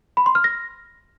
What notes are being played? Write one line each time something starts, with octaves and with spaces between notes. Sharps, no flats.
B5
C6
F6
A#6